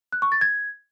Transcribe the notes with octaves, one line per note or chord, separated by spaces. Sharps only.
F#6
C#6
A6
G#6